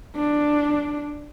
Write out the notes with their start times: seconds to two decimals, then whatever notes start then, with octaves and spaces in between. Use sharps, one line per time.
0.16 D4